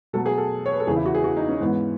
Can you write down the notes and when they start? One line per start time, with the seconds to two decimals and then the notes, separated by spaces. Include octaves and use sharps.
0.13 B2 F#3 A3 A4
0.26 G#4
0.38 A4
0.66 C#5
0.73 B4
0.80 A4
0.87 E2 C#3 E3 G#4
0.96 E4
1.06 F#4
1.15 G#4
1.24 F#4
1.37 D#4
1.49 C#4
1.61 G#2 E3 G#3 B3